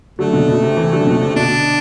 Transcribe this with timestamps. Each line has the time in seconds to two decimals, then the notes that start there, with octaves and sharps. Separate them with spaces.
0.19 D3 F#3 A3
0.33 B2 D3
0.48 B2
0.63 C3
0.77 C3 E3
0.92 D3 F#3
1.01 C3
1.07 B2 D3
1.21 C3
1.36 B2 D3 D4